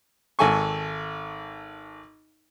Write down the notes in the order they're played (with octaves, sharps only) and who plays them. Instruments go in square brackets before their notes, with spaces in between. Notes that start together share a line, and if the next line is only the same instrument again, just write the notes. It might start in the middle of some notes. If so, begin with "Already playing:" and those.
[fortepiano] G#1 A4 G#5 C#6